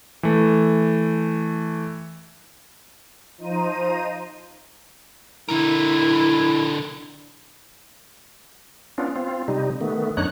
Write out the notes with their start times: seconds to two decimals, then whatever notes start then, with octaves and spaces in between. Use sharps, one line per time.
0.23 E3 A3
3.38 F3 D#4 C5 A#5 D#7
5.49 D3 E4 A#4
8.98 B3 C#4 D4 F4
9.16 C4 F4
9.48 C3 G3 D#4
9.81 D#3 A3 B3
10.17 F#2 D4 D#4 C#5 F#6